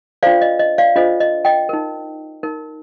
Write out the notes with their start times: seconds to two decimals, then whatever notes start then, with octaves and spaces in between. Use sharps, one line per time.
0.23 D4 F4 A4 C5 D5 F5
0.41 D#5
0.59 D#5
0.78 D5 F5
0.96 D4 F4 A4 C5 D#5
1.20 D#5
1.45 D#5 G5
1.69 D#4 A#4
2.43 D#4 A#4